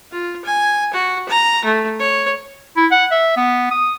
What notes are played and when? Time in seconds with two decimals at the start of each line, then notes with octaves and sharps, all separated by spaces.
0.11 F4
0.44 G#5
0.93 F#4
1.28 A#5
1.64 A3
1.99 C#5
2.76 E4
2.91 F#5
3.11 E5
3.36 B3
3.71 D#6